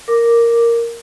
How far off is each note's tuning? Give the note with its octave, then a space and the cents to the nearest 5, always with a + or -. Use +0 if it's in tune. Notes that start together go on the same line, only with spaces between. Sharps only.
A#4 +0 D6 +0